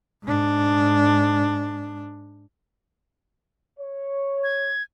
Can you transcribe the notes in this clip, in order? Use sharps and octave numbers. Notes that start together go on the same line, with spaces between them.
G#2 D4
C#5
G#6